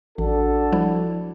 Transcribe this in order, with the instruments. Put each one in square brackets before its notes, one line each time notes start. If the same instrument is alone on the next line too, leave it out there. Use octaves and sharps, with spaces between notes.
[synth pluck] A1 [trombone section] D4 F#4 A4
[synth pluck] F3 G3 E4